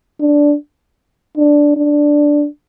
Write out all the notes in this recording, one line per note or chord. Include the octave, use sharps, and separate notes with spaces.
D4
D4
D4